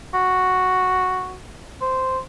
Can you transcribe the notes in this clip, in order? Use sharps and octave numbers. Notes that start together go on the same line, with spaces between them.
F#4
C5